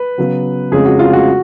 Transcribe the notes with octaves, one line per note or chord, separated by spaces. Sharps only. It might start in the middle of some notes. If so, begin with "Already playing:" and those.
Already playing: B4
C#3 F#3 B3
F2 C#3 G#3 C#4 G#4
F#4
F4
F#4